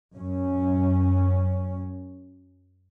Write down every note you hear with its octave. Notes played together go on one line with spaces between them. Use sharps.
F#2 C#4